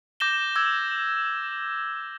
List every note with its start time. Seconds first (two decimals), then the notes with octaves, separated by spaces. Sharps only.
0.20 D6 G6 A#6 E7 G7
0.55 D6 E6 G#6